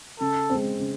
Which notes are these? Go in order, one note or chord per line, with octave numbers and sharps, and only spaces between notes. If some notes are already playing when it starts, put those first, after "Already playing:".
C#3 A4
G#3 C4
C#3